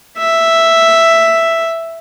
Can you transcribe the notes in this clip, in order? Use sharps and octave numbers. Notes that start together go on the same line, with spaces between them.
E5